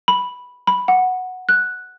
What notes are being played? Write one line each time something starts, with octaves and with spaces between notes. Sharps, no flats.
B5
B5
F#5
F#6